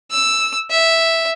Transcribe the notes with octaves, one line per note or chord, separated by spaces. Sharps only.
E6
E5